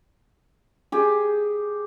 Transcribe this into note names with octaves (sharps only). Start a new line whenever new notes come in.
G4 G#4